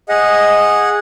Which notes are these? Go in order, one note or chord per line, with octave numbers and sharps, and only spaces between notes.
G#4 D#5 F#5